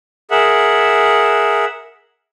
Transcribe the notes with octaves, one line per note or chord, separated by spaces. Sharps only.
G#4 A#4 E5 F#5